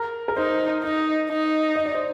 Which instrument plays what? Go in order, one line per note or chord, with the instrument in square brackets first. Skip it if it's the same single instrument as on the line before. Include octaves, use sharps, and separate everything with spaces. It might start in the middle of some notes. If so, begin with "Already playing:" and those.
Already playing: [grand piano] A#4
A#4
[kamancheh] D#4 [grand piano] C5
[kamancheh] D#4
D#4
[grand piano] D#5
D5
C5